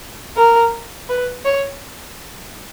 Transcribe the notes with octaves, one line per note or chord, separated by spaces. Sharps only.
A#4
B4
C#5